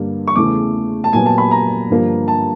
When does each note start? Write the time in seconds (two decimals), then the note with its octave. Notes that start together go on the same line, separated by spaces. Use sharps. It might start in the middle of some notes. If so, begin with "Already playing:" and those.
Already playing: G2 D3 G3 A#3
0.27 C#6
0.36 E2 C#3 E3 A3 D6
1.04 A5
1.13 A#2 F#3 B3 G#5
1.26 A5
1.38 B5
1.51 A#5
1.90 G2 D3 F3 A#3
2.28 A5